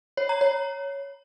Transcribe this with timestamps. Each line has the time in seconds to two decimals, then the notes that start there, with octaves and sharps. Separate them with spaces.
0.17 C#5
0.29 A#5
0.41 C#5